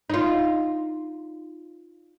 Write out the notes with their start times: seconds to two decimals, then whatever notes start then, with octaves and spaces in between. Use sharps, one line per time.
0.10 D#4 F4